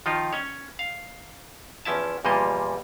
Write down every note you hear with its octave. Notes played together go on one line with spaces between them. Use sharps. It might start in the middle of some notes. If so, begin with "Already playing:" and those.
D#3 F3 D#4 F4
C#4 C#5
F5
E2 F3 C#4 E4 E5 A5
E2 A#2 F3 G3 A#3 D#5